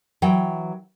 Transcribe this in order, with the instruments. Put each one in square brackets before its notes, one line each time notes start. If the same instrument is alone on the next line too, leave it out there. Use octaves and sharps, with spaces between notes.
[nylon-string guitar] E3 F#3 G5